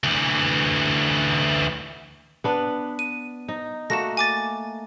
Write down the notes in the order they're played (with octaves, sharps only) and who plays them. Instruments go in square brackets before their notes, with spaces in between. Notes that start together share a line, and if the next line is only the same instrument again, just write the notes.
[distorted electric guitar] D2 E3
[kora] B3 D4 B4
[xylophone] D#7
[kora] D#4
[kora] A3 A#3 F#4 [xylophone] A#6 E7
[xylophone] G#5 D6 A6